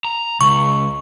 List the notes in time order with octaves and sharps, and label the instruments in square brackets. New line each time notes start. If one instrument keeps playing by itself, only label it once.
[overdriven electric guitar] A#5
[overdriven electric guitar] C#2 [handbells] C#6